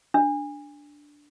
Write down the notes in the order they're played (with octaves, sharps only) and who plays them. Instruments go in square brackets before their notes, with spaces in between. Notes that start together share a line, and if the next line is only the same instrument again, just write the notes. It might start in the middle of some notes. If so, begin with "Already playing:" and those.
[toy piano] D4